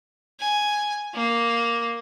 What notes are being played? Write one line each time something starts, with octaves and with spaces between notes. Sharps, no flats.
G#5
A#3